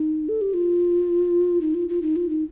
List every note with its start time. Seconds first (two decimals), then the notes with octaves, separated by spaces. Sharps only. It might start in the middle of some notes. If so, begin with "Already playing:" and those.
Already playing: D#4
0.29 A4
0.41 G4
0.54 F4
1.61 D#4
1.74 F4
1.89 F4
2.02 D#4
2.16 F4
2.29 D#4